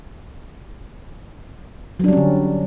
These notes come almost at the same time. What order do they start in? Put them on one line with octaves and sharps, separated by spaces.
F#3 D4 G3 C#4 D3